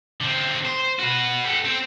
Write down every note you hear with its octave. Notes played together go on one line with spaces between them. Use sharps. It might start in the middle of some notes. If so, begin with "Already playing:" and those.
D3 C4
C5
F#4 B4
G4 A4
C4